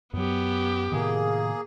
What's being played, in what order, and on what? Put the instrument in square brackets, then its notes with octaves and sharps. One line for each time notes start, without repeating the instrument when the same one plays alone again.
[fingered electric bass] F#2 F#3 [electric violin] B3 G4
[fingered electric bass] A2 C3 D#3 [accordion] A#3 G#4